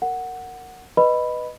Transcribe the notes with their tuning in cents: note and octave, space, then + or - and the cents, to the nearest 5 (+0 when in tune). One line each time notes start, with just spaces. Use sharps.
A#4 -15 F#5 +0
B4 +0 D#5 -10 B5 +0